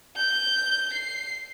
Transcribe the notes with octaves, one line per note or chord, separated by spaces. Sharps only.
G6
C7